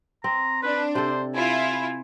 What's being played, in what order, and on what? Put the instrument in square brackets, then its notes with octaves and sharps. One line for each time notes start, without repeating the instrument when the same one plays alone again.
[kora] C4 [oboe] A#5
[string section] D4 [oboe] B4
[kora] C3 A4 [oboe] C5
[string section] E4 F4 [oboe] G#5